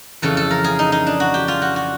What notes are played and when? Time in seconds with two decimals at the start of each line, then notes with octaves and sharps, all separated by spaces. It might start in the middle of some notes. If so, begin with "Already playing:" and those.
0.22 F2 C#3 E3 A4
0.37 A4
0.51 A#4
0.64 G#4
0.79 D#4
0.92 D#4
1.07 D4
1.20 F#4
1.34 G4
1.48 F4
1.62 F#4
1.76 F#4